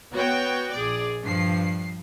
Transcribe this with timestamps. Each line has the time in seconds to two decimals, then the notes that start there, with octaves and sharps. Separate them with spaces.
0.11 B3 F#4 C#5 G5
0.72 A#1 G#4 D5
1.22 G2 F3 C7